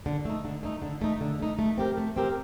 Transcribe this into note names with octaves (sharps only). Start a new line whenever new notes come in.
D3
A3 D#4
D3
A3 D#4
D3
A3 D#4
D3
A3 D#4
A3
C4 G4 A#4
A3
C4 G4 A#4